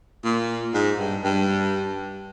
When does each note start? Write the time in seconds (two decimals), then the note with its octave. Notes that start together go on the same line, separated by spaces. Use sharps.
0.24 A#2
0.74 G#2
0.99 G2
1.24 G2